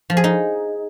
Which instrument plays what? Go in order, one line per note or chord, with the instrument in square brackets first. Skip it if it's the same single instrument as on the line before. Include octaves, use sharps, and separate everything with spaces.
[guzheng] F3
G#4
D#4